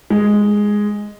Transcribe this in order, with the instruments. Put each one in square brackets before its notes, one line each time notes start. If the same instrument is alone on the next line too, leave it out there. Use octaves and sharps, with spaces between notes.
[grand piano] G#3